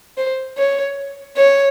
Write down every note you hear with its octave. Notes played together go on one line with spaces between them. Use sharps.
C5
C#5
C#5